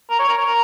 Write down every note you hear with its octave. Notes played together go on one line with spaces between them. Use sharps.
A#4
C#5
A#4
C#5
A#4